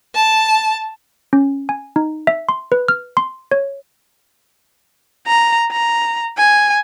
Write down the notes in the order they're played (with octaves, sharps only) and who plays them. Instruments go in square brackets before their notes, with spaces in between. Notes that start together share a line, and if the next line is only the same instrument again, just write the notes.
[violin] A5
[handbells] C#4
G#5
D#4
E5
C6
B4
F6
C6
C#5
[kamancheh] A#5
A#5
G#5